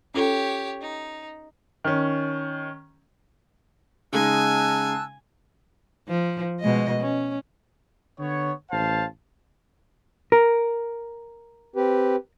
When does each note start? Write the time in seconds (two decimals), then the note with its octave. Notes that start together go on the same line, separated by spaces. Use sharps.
0.14 C#4 F4 G4 A4 C#5
0.81 D#4
1.84 D#3 C#4
4.13 C#3 G#3 D#4 G#5 A5 E6 F#6
6.08 F3
6.61 B2 G#3 D#5
7.00 C#4
8.19 D3 B3 C#5
8.70 A1 C5 F5 A5
10.32 A#4
11.76 C4 G4 B4